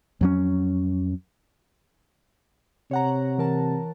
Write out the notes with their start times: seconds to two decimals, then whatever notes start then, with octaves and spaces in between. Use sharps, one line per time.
0.21 F2 F#3 C#4
2.91 C3 C#5 F#5 A#5
3.38 E3 A#4 A5